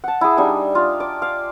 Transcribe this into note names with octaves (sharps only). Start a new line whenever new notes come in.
F#5 A5
E4 G#4
G3 D4 D#4 G#5
F4
D5
F5